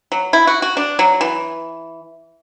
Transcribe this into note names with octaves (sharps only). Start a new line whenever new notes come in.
F#3
E4
F#4
F#4
D4
F#3
E3